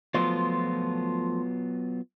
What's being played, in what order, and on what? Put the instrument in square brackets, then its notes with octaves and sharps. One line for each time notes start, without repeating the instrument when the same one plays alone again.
[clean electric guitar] F3 A3 C5 [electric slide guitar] F#3 B3 F4